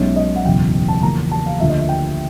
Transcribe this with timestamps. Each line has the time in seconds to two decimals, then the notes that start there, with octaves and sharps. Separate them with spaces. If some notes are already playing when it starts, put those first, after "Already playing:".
Already playing: B1 B2 G#3 C#4 E5
0.16 D#5
0.36 F#5
0.45 F#1 E2 B2 F#3 G5
0.88 A5
1.03 E2 C#3 F3 A#3 A#5
1.31 A5
1.46 F5
1.60 D2 D3 F3 A#3 E5
1.69 D#5
1.79 E5
1.89 G5